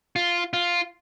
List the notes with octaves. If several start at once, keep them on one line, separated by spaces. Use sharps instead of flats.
F4
F4